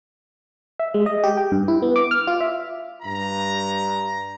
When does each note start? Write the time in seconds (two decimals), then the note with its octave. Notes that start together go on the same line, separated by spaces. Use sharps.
0.79 E5
0.94 G#3
1.06 D#5
1.24 G4
1.37 G5
1.52 G2
1.68 E4
1.82 B3
1.96 D6
2.11 F6
2.27 F4
2.40 E5
3.03 G2 A#5